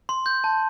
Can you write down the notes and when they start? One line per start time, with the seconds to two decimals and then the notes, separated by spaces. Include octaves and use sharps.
0.09 C6
0.26 G6
0.44 A5